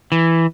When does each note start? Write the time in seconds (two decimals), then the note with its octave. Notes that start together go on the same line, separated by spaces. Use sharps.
0.12 E3